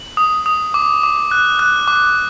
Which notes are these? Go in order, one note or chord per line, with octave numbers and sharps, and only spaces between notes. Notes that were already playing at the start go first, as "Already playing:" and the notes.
Already playing: F#7
D#6
D#6
D6
D6
F#6
F#6
D6